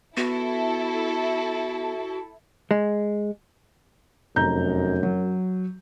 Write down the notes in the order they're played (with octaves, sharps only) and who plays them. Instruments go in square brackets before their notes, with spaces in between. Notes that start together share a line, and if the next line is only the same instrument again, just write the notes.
[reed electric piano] B3 [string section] E4 A4 [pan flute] F#4
[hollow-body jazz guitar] G#3
[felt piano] F1 A#5 G6 [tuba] F#2
[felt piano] F#3